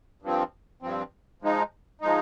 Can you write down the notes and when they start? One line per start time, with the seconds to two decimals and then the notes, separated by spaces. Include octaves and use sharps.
0.22 G2 F3 C4
0.82 G2 F3 C4
1.42 F3 G#3 D#4
2.01 F3 G#3 D#4